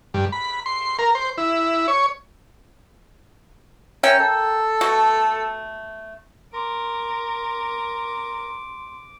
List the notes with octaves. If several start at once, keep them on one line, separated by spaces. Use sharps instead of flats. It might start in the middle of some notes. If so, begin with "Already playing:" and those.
G2
B5
C6
A#4
C5
E4
C#5
C#4 A#4 E5 G5
A4
B2 A3 F#4
A#4 C6 D6